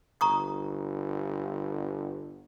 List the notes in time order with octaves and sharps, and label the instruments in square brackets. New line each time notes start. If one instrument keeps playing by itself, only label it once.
[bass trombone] G1 [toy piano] A#5 C#6 D#6